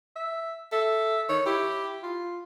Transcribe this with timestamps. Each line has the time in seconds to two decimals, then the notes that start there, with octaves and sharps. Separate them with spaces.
0.16 E5
0.72 A4 E5
1.29 D#3 C#5
1.46 E4 G4
2.03 F4